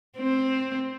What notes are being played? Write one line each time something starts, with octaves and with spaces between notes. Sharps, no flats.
C4